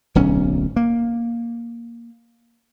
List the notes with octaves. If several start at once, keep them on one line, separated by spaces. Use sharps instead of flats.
D1 B1 C#4
A#3